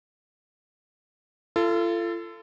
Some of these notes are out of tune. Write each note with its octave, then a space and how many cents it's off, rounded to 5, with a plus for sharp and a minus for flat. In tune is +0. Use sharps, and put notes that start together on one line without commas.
F4 -35 A4 +15